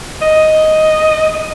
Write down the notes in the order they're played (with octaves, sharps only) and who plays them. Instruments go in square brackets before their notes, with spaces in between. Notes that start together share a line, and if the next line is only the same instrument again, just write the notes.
[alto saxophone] D#5